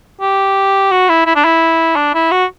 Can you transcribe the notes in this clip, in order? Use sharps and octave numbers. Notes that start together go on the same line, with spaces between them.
G4
F#4
E4
E4
D4
E4
D4
E4
F#4